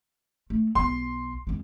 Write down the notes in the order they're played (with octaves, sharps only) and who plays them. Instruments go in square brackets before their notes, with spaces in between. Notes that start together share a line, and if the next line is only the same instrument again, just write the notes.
[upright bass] A3
[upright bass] B1 B3 [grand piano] C6
[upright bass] F2 G#3